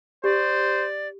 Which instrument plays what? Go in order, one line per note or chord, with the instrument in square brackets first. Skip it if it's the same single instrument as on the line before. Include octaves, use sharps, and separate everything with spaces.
[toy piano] G4 [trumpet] C5 [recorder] D5